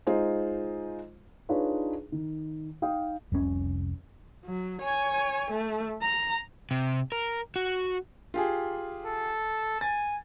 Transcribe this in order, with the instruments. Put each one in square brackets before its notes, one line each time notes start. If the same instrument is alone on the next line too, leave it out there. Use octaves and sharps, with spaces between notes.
[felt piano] G#3 D#4 F4 G#4 C5
[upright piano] D4 D#4 F4 G#4 B4 C#5
D#3
D#4 F5 G5 D#6
[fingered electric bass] F1 C2 B2 C#4
[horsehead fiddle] F#3
C#5 G#5
A3
A#5
[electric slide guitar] C3
A#4
F#4
[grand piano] F4 G4 G#4
[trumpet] A4
[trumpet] G#5 [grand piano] A6